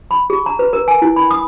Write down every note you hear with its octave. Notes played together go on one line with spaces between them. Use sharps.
B5
G#4
A#5
B4
A#4
G#5
E4
B5
D#6